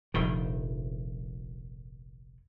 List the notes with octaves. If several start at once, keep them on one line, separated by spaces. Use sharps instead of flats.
F1 A#1 D#3